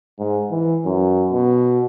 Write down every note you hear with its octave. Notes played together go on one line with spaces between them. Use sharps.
G#2
E3
F#2
B2